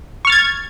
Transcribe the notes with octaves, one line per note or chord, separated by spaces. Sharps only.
C#6 F6 G#6 A6